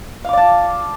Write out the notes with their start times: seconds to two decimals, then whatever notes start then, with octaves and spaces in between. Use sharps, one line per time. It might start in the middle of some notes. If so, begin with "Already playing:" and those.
0.25 F5
0.29 D6
0.33 D5
0.37 A5